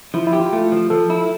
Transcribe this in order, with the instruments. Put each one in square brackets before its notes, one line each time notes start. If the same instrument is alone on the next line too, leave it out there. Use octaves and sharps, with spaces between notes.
[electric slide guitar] F3 [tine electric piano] E4
[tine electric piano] E4
[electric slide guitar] G4
[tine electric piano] F4
[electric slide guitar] A3
F3
[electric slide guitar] F3 [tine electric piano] A4
[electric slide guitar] E4